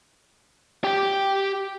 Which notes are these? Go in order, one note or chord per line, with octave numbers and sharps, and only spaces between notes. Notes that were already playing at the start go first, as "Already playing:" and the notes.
G4 G5